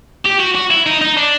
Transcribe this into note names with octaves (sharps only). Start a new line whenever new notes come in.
G4
F#4
F#4
E4
D#4
D#4
D4